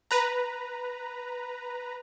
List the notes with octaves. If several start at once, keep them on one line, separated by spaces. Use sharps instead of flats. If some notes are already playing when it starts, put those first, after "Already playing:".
B4 A#5